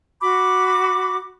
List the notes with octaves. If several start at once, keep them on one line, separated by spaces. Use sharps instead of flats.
F#4 B5 D6